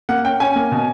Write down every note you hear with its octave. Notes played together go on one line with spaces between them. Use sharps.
A#3 F#5
C#4 G5
C#4 G#5
A#3
B2